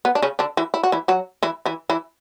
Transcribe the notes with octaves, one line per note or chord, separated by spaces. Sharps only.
B3
D4
C#3 C#4
D3 D4
E3 E4
E4
F#4
E3 E4
F#3 F#4
E3 E4
E3 E4
E3 E4